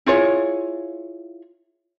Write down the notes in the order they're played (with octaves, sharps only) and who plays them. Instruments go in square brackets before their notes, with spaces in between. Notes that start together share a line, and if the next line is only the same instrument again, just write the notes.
[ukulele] E4 F4 G#4 C#5